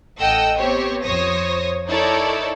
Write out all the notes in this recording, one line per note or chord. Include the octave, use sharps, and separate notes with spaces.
A1 A4 D#5 F#5 G5 E6
B3 C4 G4 C5 C#5
F2 C5 C#5 D#6 A#6
D#4 E4 A4 A#4 C#5 D5